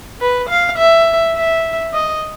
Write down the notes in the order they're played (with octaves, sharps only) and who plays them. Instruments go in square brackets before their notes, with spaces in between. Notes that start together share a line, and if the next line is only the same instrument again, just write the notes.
[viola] B4
F5
E5
E5
D#5